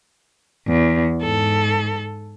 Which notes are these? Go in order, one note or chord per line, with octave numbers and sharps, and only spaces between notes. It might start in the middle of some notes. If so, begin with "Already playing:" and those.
E2
G#2 A4